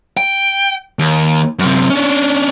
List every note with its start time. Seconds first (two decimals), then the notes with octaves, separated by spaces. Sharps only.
0.17 G5
0.99 D#2
1.59 F#2 C3
1.90 C#4 D4